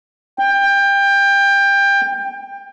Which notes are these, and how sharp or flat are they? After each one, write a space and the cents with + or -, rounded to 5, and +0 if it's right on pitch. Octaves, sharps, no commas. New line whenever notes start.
G5 +20